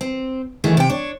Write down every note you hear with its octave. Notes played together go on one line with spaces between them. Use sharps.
C4
F#2 D#3 E3 A3 E4 G#4
C3 G5
D4 C#5